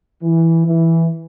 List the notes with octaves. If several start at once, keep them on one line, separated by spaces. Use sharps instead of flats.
E3
E3